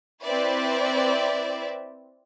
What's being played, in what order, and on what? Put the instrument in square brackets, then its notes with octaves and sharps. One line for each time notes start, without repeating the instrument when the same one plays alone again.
[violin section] C4 E4 B4 D5 E5